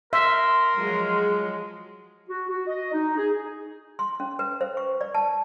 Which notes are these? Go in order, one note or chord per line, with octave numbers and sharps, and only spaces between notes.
A#4 E5 C6
F3 F#3 G#3
F#4
F#4
D#5
D#4
G#4
C6
C#4
B4
C5
C#6
D5
A5